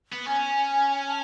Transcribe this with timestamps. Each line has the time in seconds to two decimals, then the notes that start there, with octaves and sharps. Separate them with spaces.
0.12 B3
0.27 C#4 G#5
1.08 A5